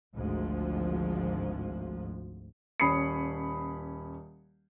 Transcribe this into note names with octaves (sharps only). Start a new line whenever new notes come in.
G#1 D2 G#2 F3
D#1 C#4 B5 D#6 C7 C#7